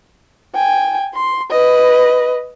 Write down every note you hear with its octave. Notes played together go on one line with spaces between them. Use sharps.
G5 G#5
C6
B4 D#5